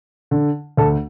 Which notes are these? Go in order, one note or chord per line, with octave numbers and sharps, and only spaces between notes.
D3
D2 A4